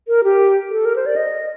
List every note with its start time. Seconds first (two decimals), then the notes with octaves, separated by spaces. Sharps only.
0.08 A#4
0.24 G4
0.70 A4
0.85 A#4
0.96 C5
1.06 D5
1.16 D#5